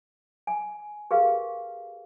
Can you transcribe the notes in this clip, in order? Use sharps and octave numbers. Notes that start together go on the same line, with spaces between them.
G#5
G4 G#4 A#4 B4 F5